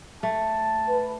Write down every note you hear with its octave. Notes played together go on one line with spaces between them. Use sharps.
A3 A5
B4